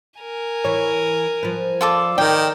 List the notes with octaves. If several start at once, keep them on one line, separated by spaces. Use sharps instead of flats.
A#4 G#5
E3 C#5
F3 B4
F4 A4 D5
D#3 A#4 D5 G5